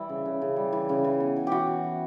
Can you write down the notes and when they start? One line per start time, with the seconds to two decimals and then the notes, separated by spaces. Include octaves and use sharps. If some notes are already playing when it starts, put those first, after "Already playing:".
Already playing: E3 G3 E4
0.09 C#3
0.26 C#3
0.42 C#3
0.56 G3
0.73 E3
0.89 C#3
1.04 E3
1.20 B3
1.36 E3
1.47 E3 F#4 G4
1.68 E3
1.84 E3